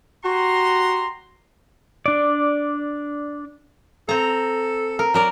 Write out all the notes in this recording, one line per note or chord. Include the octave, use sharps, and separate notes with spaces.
F#4 G4 A#5 C6
D4 D5
C4 A4 A#5
A#4
F#3 A#4 D5